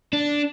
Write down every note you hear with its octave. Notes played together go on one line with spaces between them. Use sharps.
D4